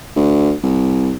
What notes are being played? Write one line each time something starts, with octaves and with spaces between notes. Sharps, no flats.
D2
C2